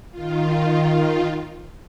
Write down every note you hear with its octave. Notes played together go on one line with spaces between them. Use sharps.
D#3 F4